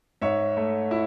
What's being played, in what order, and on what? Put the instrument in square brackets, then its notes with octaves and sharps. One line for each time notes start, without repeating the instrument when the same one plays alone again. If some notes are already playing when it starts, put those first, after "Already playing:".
[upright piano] G#2 C#5 E5
A3
E4